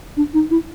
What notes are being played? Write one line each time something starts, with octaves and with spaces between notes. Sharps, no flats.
D4
D#4
E4